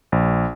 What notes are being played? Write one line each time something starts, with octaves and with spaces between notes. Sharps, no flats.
A#1